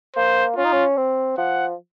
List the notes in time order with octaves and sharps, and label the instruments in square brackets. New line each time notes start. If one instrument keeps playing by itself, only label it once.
[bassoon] A#3 [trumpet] C5
[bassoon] C#4 [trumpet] F4
[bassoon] D#4
C#4
C4
[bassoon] F3 [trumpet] F#5